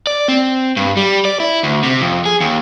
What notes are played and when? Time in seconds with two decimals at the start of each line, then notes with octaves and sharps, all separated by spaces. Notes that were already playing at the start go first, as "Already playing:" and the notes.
0.07 D5
0.28 C4
0.76 G2
0.97 G3
1.25 D5
1.40 E4
1.63 D2
1.83 C3
2.01 F2
2.25 G#4
2.40 D#2